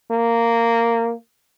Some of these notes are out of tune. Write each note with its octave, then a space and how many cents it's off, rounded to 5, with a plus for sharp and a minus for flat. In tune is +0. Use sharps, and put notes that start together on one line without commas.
A#3 -10